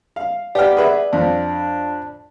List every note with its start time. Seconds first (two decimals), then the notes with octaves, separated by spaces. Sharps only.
0.16 F5
0.55 B3 G4 D5 G5 F6
0.77 G#4 B4 E5
1.13 F2 D4